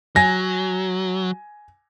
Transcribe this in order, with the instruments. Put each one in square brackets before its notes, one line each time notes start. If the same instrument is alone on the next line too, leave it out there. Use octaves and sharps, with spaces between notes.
[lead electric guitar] F#3 [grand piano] G#5 A#6